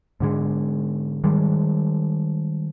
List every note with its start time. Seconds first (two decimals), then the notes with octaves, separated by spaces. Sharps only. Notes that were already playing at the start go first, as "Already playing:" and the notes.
0.20 G#2 D3 G#3
1.24 D#3 G3 G#3